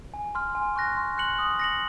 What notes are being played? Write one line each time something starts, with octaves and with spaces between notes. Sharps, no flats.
G#5
C6 F6
G#5
C#6 F#6 A#6
C6
F#6 C#7 F#7
D#6
A#6 C#7 F#7